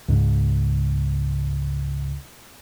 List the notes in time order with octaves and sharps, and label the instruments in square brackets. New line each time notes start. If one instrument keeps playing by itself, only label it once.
[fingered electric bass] C#2 G#2